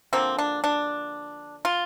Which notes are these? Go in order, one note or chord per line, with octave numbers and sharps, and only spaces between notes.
D3 F3 A#3 C4
D4
D4
F4